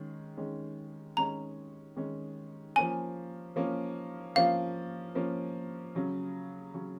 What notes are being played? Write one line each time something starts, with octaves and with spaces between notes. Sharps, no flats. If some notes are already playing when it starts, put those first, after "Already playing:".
Already playing: D#3 G#3 C#4
D#3 G#3 C#4
D#3 G#3 C#4 A#5
D#3 G#3 C#4
F3 A#3 C#4 G#5
F3 A#3 C#4
F3 A#3 C#4 F5
F3 A#3 C#4
C#3 F#3 C#4
C#3 F#3 C#4